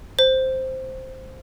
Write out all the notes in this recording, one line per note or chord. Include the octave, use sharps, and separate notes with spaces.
C5